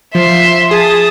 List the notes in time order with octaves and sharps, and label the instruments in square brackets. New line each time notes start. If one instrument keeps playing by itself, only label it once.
[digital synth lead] F3 [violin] E5 C6
[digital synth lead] G#4 [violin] A5 D#6